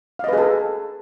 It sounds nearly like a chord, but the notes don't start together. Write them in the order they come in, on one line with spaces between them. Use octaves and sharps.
F5 D#5 B4 G#4 A4